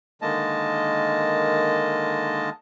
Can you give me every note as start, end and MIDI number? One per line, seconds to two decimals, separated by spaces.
0.22 2.50 50
0.22 2.50 51
0.22 2.50 56
0.22 2.50 58
0.22 2.50 75
0.22 2.50 81